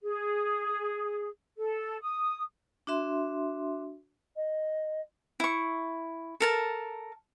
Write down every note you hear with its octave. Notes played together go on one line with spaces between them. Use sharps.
G#4
A4
D#6
D4 F#4 E5 C6
D#5
E4 C#6
A4 A#4 A5